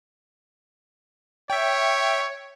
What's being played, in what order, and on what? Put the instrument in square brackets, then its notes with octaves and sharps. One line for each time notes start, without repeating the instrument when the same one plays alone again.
[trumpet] C#5 [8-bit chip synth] E5 G5